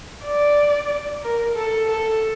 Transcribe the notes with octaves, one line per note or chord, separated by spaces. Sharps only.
D5
A#4
A4
A4